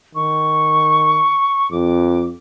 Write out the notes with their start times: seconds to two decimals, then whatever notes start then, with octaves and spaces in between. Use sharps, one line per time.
0.15 D#3 C#6
1.71 F2 D6